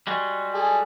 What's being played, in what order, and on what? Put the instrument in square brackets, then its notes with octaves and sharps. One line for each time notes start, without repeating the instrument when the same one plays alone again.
[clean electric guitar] G3 G#3 F#4
[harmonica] G#4 A4